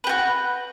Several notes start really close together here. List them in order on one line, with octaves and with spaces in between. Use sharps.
B4 G4 F#4